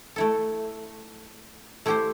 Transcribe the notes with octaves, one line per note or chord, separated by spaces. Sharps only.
A3 E4 A4
A3 E4 G4 C5